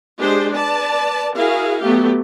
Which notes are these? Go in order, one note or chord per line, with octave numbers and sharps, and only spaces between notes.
G#3 D4 G4 G#4 C5
B4 D5 A5
E4 F#4 G#4 A#4 F5
F#3 A3 B3 G4